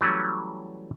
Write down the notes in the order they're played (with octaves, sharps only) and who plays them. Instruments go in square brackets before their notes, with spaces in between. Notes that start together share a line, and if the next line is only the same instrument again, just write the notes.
[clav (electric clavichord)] E3 F#3 G3 A3 C#4